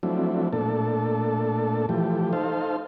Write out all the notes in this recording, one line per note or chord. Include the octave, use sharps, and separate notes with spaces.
F3 F#3 A3 C4 D4 E4
A#2 A3 D4 A4
E3 F3 A3 G4
D#4 A4 C5 F5